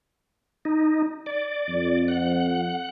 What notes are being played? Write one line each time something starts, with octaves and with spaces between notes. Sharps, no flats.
D#4
D5
F2
F#5